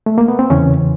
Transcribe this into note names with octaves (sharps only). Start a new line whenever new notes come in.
A3
A#3
B3
C4
E2 C#3 E3 C#4